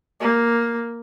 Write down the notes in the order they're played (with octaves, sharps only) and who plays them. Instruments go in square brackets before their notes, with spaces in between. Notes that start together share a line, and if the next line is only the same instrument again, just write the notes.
[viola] A#3